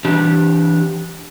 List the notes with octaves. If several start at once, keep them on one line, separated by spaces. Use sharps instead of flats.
E3 D4 G4